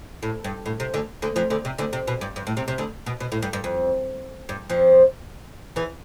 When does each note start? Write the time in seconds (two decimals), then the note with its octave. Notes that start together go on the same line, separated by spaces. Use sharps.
0.23 A2
0.44 G2
0.66 A2
0.80 C3
0.94 D2 D3
1.22 D2 D3
1.36 F2 F3
1.50 D2 D3
1.65 C3
1.78 D2 D3
1.93 C3
2.07 B2
2.21 G2
2.36 G2
2.47 A2
2.57 C3
2.68 C3
2.78 D2 D3
3.06 B2
3.20 B2
3.32 A2
3.42 G2
3.53 G2
3.64 F2
4.49 G2
4.69 F2 F3
5.76 E2 E3